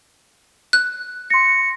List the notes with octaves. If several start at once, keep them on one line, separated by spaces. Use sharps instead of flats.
F#6
C6 A#6 C#7